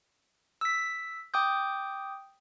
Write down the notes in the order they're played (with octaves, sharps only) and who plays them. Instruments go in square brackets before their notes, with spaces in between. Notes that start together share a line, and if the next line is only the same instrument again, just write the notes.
[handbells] E6 B6
G5 D6 D#6 G6